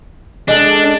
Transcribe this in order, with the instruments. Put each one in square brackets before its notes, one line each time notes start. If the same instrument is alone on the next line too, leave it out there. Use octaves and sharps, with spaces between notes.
[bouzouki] G#3 A4 [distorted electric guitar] D4